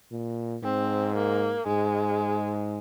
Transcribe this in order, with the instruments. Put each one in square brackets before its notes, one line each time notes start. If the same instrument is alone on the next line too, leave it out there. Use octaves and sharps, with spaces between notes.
[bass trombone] A#2
[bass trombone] G#2 [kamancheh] C4
[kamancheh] A#3
[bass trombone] G#2 [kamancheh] G#3